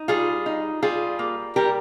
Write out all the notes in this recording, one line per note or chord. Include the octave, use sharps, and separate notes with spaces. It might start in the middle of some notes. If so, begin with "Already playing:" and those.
Already playing: D#4
G3 F4 G#4
D#4
G3 F4 G#4
A#3
G3 G4 A#4